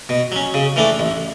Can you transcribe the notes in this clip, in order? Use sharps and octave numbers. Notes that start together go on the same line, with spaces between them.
B2
F#3 C#4
C#3
E3 A3 D4
A1